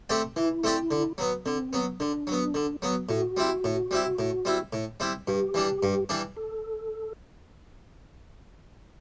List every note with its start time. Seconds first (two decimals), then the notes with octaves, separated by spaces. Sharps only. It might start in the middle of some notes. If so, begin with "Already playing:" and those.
0.10 A3 C4 G4 D5
0.36 E3 E4
0.64 A3 C4 G4 D5
0.91 D3
1.18 F#3 B3
1.46 D3 C4
1.73 F#3 B3
2.00 D3 D4
2.27 F#3 B3
2.54 D3
2.82 F#3 B3
3.09 A2 F#4
3.37 G3 C4 E4
3.64 A2
3.91 G3 C4 E4
4.19 A2
4.45 G3 C4 E4
4.73 A2
5.00 G3 C4 E4
5.28 G2 G4
5.54 E3 G3 D4
5.83 G2
6.09 E3 G3 D4
6.37 A4